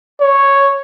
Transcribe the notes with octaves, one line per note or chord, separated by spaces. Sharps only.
C#5